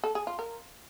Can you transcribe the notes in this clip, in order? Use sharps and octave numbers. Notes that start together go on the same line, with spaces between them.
A4
G#4
F4
A#4